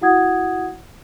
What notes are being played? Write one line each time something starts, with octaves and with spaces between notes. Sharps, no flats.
E4 F#4 F#5 D#6 G#6